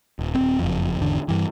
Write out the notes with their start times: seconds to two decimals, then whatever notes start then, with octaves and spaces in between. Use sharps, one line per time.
0.19 D#1
0.35 D#1 G#1 C4
0.59 F#1 F2
0.99 G#1 E2 D3
1.28 G2 E3